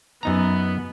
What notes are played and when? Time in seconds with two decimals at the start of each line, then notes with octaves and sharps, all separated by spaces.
0.23 F#2 B3 D#4 A#5